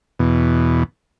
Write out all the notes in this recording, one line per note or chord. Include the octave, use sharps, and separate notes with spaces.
E2 B2